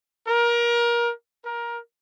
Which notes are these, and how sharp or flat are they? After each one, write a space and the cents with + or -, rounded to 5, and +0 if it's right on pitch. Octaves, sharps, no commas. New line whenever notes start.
A#4 +25
A#4 +20